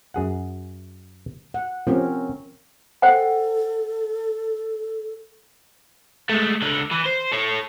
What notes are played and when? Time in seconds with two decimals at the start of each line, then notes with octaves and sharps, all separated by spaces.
0.14 F#2 G#4 F#5
1.54 F#5
1.87 F3 C4 C#4 G4 A#4
3.02 A4 C5 F#5 G5
6.29 G#3 A3
6.62 C#2 D3
6.92 E3
7.06 C5
7.32 A4 C#5